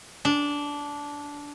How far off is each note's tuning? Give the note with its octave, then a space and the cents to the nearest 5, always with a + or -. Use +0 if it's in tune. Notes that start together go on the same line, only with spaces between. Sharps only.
D4 -15